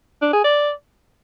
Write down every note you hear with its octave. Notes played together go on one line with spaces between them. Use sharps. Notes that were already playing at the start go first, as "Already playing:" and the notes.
D4
G#4
D5